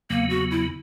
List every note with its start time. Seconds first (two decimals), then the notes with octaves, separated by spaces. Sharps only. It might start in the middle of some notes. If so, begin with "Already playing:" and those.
0.10 E2 C#3 F#3 A#3 B3
0.30 F#4
0.51 E4